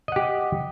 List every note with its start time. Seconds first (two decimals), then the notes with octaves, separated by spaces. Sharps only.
0.08 D#5
0.12 F#5
0.16 G4